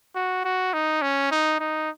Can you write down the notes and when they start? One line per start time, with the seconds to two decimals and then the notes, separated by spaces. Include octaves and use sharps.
0.15 F#4
0.45 F#4
0.73 D#4
1.02 C#4
1.31 D#4
1.60 D#4